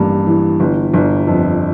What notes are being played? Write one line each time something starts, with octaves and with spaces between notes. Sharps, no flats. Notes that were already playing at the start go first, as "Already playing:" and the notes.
Already playing: A1 G2 A#3
E3
G1
G1
F2